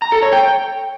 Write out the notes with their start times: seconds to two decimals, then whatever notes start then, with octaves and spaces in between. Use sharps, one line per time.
0.02 A#5
0.12 A4
0.22 C#5
0.33 G5